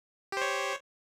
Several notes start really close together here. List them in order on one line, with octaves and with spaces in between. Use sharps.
G4 C5 C#5